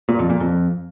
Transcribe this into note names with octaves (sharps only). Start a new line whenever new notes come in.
A#2
F2
A#2
F2